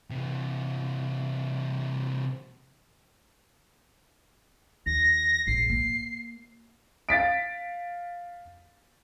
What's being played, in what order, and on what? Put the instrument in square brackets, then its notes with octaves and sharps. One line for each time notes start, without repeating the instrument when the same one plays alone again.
[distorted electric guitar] C3 E3
[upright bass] D#2 [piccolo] A#6
[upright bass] A#1 G#2 [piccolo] C7
[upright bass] A#3
[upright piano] F5 A6 B6 D7